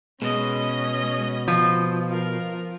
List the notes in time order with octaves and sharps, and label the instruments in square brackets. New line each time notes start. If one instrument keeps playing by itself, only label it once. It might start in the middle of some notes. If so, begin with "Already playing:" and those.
[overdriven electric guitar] B2 [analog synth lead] G#3 [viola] C#4 D#5
[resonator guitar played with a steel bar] F3 [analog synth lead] D#6
[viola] A#4 [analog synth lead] F5